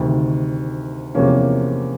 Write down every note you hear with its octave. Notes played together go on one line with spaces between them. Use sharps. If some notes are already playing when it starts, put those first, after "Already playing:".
Already playing: D2 C3 D#3
E2 C3 F3 A#3 C#4